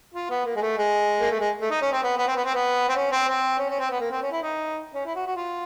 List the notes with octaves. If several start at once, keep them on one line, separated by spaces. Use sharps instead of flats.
F4
B3
A#3
G#3
A3
G#3
A#3
A3
G#3
A3
D#4
C#4
C4
B3
B3
C4
B3
C4
B3
C4
C#4
C4
C4
C#4
C#4
C4
B3
A#3
C4
C#4
E4
D#4
C#4
E4
F#4
F#4
F4